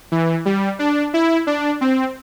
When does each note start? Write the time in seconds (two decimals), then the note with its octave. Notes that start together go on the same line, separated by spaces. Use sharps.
0.12 E3
0.45 G3
0.79 D4
1.14 E4
1.47 D4
1.81 C4